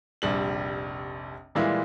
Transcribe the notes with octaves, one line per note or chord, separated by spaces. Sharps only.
F1 A#1 G3 F#7
A#2 E3 G3 G#3 E4 F4